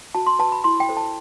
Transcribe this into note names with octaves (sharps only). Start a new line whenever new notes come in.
F#4 A5
C6
B4 A5
B5
E4 C6
G5
A4 C5
A5